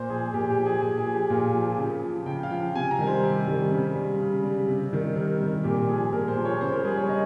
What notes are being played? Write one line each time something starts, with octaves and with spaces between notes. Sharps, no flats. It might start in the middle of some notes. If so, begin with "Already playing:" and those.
Already playing: A#2 C5
F3 G#4
A#2 G4
G4
F3
G#4
A#2 G#4
G#4
F3
G4
A#2 F4
F3
G4
C#3
F3
C#3 G5
F5
F3 G5
C3 G#5
A#5
D#3 G3
C5
C3 G4
D#3 G3
C#3
G3
C#3
G3
C3
D#3 G3
C3 A#4
D#3 G3
A#2 G4
F3 G#4
A#2 A#4
C5
F3
C#5
C#3 C5
A#4
G3 G#4
C#5
C#3 D#5